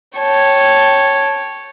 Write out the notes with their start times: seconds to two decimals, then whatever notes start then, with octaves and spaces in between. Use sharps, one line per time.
0.18 C#5 G5 A5